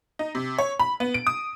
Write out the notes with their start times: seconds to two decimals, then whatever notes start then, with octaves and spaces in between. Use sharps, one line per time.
0.19 D#4
0.35 C3
0.59 C#5
0.80 B5
1.00 B3
1.14 D7
1.27 D#6